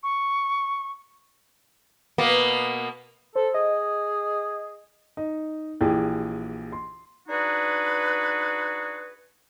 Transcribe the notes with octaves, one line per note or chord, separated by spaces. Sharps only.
C#6
B2 A#3 B3
A4 C5
G#4 D#5
D#4
A#1 E3 G4 G#4
C6
D4 D#4 F#4 G#4 B4